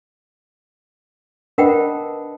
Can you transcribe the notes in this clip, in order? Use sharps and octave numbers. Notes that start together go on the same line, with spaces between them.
D4 A#4 B4 D#5 F#5 G5